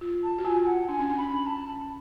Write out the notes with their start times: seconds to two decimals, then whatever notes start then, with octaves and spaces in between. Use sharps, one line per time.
0.01 F4
0.24 A5
0.38 F#4
0.45 F4 G#5
0.62 G#5
0.67 F#5
0.88 D4 G#5
0.99 C#4
1.10 D4
1.17 B5
1.47 A5